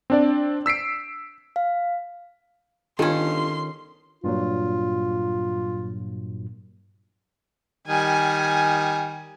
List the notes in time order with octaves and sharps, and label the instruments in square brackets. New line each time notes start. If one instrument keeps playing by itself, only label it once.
[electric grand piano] C4 D4 D5
E6 B6 C7 D7
[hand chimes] F5
[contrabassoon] G1 [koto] D#3 C#4 [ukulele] F4 A4 [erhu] C6
[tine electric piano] G2 A#2 F#3 [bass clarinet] F4
[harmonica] D#3 G3 [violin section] G#5